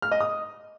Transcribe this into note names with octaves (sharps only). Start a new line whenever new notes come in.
F6
D#5
D#6